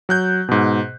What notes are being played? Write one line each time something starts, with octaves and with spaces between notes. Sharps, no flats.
F#3 F#6 G6
G#2 B2